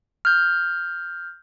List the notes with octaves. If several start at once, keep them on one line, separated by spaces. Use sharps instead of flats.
F6 G6